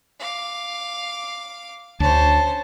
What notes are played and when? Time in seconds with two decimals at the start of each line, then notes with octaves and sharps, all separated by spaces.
0.20 F5 D6
2.00 D2 D3 C#4 C5 A5